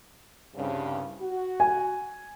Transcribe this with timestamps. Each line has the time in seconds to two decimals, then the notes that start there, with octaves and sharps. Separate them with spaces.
0.55 C2 G2 C#3
1.21 F#4
1.60 G#5